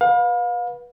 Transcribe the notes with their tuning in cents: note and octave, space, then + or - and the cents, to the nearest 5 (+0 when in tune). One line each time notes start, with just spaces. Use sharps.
B4 -20 F5 +35